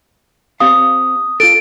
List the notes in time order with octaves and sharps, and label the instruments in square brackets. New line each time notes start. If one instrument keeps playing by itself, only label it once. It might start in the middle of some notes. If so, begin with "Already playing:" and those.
[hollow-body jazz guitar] C4 G4 F5 [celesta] D#6
[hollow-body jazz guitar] F4 A4 [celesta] D7